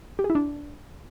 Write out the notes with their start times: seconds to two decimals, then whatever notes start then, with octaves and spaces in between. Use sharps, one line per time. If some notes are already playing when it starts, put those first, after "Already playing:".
0.19 G4
0.24 G#4
0.30 E4
0.35 D4